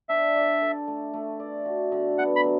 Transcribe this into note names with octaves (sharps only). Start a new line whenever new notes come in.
D4 E5
D5
A4
A3
A3
D5
F#4
D3
B3 F#5
B5
F#3